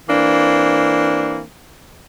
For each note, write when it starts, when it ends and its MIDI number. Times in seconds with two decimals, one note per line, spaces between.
0.10 1.43 52
0.10 1.43 58
0.10 1.43 60
0.10 1.43 62